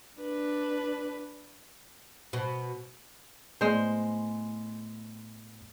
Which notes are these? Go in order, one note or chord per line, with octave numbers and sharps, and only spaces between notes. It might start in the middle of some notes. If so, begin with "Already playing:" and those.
D4 B4
B2
A2 G#3 B3 C5